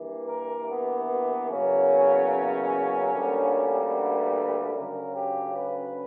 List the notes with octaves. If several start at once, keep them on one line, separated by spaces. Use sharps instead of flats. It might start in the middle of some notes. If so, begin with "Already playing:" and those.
Already playing: G2 E3 A#3
A#4
B3
E2 C#3 F#3 A#3 C#4
D2 D3 G3 A#3
B4
D2 C#3 F#3 A#4
G4
B4